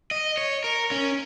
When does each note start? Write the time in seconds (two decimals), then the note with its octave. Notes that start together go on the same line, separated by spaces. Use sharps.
0.11 D#5
0.38 C#5
0.64 A#4
0.91 C#4